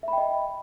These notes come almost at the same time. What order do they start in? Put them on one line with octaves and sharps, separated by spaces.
E5 B5 G5 D#5